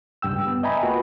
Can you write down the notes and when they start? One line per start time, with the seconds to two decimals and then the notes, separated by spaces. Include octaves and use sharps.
0.22 C#2 G2 G5 E6
0.47 B3
0.63 D#5 E5 G5 G#5 A#5 B5
0.83 A#3 F4 F#4 B4